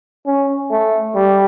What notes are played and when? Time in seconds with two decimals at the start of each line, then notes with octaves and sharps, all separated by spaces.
0.26 C#4
0.71 A3
1.15 G3